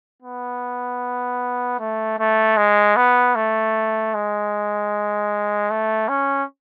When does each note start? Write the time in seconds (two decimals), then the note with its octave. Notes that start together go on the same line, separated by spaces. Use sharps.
0.22 B3
1.79 A3
2.19 A3
2.57 G#3
2.96 B3
3.36 A3
4.14 G#3
5.70 A3
6.08 C#4